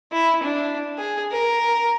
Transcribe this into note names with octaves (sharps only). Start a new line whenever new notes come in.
E4
D4
G#4
A#4